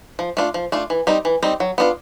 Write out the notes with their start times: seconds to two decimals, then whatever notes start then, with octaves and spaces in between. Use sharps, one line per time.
0.19 F3
0.37 A3 D4 F4
0.54 F3
0.72 A3 D4 F4
0.90 E3
1.07 G3 C4 D#4
1.25 E3
1.43 G3 C4 D#4
1.60 F#3
1.78 B3 D4 F4